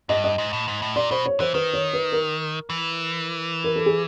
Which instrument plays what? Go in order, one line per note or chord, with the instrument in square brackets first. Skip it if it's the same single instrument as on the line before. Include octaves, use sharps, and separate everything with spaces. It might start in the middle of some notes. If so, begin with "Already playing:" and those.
[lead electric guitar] G2 [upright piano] D#5
[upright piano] D#5
[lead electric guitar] G#2
A2
G#2
A2
[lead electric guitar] A#2 [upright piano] D5
[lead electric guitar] B2 [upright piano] C5
[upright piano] C#5
[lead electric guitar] E3 [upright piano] C5
[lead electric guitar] D#3 [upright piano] B4
[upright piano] C#5
B4
A#4
[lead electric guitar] E3
[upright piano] A#4
A4
G#4